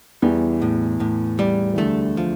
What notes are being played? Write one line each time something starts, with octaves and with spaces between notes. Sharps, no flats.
E2 E3 G3
A2
A2
G3
E3
D2 D3 A3
F3